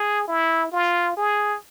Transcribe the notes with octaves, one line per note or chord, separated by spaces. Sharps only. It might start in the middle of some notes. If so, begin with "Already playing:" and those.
Already playing: G#4
E4
F4
G#4